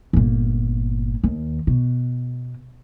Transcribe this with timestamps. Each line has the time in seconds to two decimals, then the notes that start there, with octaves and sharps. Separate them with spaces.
0.13 G1 A#2
1.24 D#2
1.67 B2